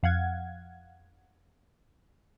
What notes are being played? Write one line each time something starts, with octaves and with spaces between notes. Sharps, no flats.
F2 F5 F#5 G#6